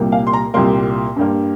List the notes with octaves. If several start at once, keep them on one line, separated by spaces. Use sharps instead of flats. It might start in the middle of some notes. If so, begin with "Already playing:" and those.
Already playing: C2 A#2 G3 A#3
F5
C6
A#5
C2 A#2 G3 A#3 C6
G2 G3 A#3